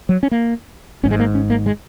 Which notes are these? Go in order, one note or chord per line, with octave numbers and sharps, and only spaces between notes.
F#3
C#4
A#3
G#1 G#2 C#4
G#3
A#3
C#4
A#3
G#3